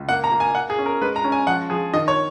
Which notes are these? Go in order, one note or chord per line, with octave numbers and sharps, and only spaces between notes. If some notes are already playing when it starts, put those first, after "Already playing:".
Already playing: C#2
A#3 F#5
A#5
A#3
G#5
A#3 F#5
G#4
C#4
A#4
G#3 B4
A#5
C#4
G#5
F3 F#5
F3 G#4
D#3 D#5
C#5